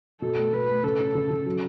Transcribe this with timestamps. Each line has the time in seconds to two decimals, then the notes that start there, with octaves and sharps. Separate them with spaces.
0.21 B2 A4
0.37 A3
0.53 B2 B4
0.69 A3
0.83 C#3 A4
1.00 C#4
1.15 C#3
1.30 C#3
1.46 F#3